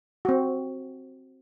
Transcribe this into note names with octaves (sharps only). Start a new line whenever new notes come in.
C4 F#4